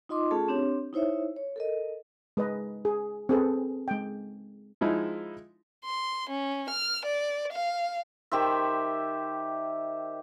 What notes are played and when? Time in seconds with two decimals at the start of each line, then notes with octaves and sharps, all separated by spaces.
0.09 D#4 F4 D#5 C6 D6
0.31 A3 C#4 F4 G#4 A4 A5
0.48 C4 D4 G4 C#5
0.93 D#4 E4 C5 C#5 E5
1.37 C#5
1.56 A4 A#4 D#5
2.37 G#3 B4 D#5
2.85 G#4
3.29 C4 G#4 A4 B4
3.88 G#3 G5
4.81 F3 G#3 D#4 E4
5.84 C6
6.30 C#4
6.70 F6
7.05 D5
7.53 F5
8.32 D#3 G4 C5 E5